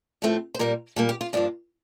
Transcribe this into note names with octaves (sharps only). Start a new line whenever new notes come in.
A2 F3 A3 C4
C5
A#2 G3 A#3 A#4
A#2 G3 A#3 A4
G4
F4
G2 F3 A#3 D4